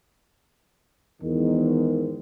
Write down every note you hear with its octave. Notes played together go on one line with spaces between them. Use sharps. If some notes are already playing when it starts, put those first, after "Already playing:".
E2 G#2 D#3